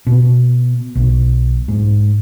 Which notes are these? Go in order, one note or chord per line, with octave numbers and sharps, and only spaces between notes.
B2
B1
G#2